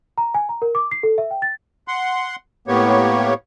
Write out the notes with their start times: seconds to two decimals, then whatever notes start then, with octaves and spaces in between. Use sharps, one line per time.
0.18 A#5
0.34 G#5
0.49 A#5
0.62 A#4
0.75 D6
0.91 C7
1.03 A4
1.18 E5
1.31 G5
1.42 A6
1.88 F#5 C6
2.68 A2 A#3 B3 G4 C#5